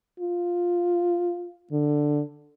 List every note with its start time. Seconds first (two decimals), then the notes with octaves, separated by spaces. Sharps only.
0.20 F4
1.72 D3